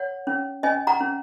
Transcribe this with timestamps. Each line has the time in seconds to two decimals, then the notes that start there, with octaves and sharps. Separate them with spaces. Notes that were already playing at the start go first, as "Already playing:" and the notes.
Already playing: C#5 F#5
0.27 C#4
0.63 C#4 D#5 G#5
0.87 F#5 A#5
1.00 C#4